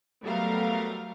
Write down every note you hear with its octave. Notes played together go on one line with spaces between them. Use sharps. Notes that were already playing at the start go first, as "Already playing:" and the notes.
F#3 G3 A3 B3 A#4 F5